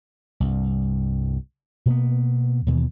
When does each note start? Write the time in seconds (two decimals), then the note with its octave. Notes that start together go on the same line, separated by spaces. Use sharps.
0.40 C2 G2
1.86 B2 A#3 B3
2.66 D#2 B2 E3